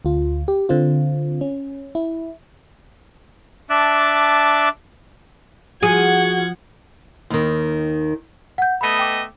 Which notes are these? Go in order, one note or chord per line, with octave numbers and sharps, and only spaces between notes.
D2 F4
G4
D3 C4 F4
C#4
E4
D4 E5 A5 D6 F#6
F3 F#4 G#4 F#5 G#6
D#2 D#3
F#5 G6
A3 B3 D#5 B5
G5 D6